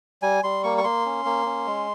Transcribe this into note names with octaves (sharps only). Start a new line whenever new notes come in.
G3 G#5
G3 C6
A#3 C#6
C#6
A#3 C6
C#4
A#3
C#4
G#3